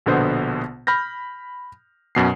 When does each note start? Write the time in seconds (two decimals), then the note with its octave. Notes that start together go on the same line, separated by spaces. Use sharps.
0.06 A#1 B2 D3 B3 C5
0.87 B5 F6 G6 A#6
2.15 F#2 B2 C7